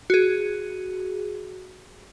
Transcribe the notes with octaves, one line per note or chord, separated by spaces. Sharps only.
F#4 G#4